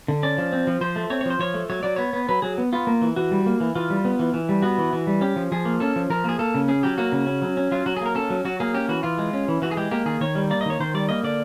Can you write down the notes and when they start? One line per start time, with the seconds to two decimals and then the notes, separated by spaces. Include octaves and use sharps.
0.08 D3
0.23 C#4 D5
0.38 F3
0.52 C4
0.67 F3
0.81 F3 C5
0.96 A3
1.10 C4 C#5
1.21 C#5
1.25 F3 C5
1.39 F3 C#5
1.54 A3
1.70 F#3 C#5
1.83 F#3 D5
1.96 B3 C#5
2.13 B3
2.29 F#3 B4
2.42 F#3 G#4
2.58 B3
2.73 B3 F4
2.87 A#3
3.02 E3
3.16 E3 F#4
3.31 G3
3.46 A#3
3.60 E3
3.75 E3 F4
3.90 G3
4.05 B3
4.19 E3
4.34 E3
4.49 G3
4.62 B3 F#4
4.78 E3
4.93 E3
5.07 G3
5.21 C#4 G4
5.36 F3
5.52 F3 G#4
5.65 A#3
5.80 C#4 A4
5.96 F3
6.10 F3 A#4
6.24 A#3 G#4
6.39 A#3 A4
6.55 C#3
6.68 C#4 G#4
6.83 F#3 G4
6.98 A#3 F#4
7.12 C#3
7.27 C#4
7.42 F#3
7.57 C#4
7.72 F#3 F4
7.86 F#3 F#4
7.97 G#4
8.01 A#3 A#4
8.15 C#4 A4
8.30 F#3
8.45 F#3 F#4
8.60 A#3 G#4
8.74 C#4 G4
8.89 E3 F#4
9.03 E3 F4
9.18 G#3
9.33 C#4
9.48 E3
9.62 E3 F#4
9.71 G#4
9.77 G#3 G4
9.91 A#3 G4
10.06 D#3 G#4
10.20 D#3 C#5
10.35 G3
10.50 A#3 D5
10.61 D#5
10.66 D#3 C#5
10.80 D#3 C5
10.94 G3 D5
11.09 A#3 D#5
11.24 D3 D5